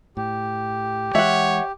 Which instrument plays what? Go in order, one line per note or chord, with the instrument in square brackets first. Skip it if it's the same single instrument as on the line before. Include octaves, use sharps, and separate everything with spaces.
[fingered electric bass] A2 [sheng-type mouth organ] G4
[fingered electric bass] E3 G#3 [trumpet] C#5 [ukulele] E5 F#5